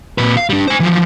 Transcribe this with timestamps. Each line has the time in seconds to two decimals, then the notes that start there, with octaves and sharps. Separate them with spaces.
0.18 A#2 B4
0.37 F5
0.50 G3 D4
0.68 C5 G#5
0.80 E3 F3